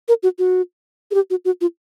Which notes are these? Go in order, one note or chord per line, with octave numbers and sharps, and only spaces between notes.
A#4
F#4
F#4
G#4
G4
F#4
F#4
F4